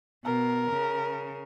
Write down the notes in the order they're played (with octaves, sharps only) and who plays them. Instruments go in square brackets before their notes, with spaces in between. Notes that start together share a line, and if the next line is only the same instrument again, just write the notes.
[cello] B2 [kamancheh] A#4
[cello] C#3